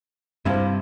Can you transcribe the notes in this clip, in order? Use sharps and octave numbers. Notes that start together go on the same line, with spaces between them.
G2 C3 E4 F4 C5